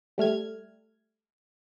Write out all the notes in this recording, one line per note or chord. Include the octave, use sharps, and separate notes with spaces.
G3 A3 F6 G#6